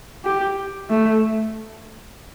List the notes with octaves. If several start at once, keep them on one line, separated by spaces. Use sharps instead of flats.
G4
A3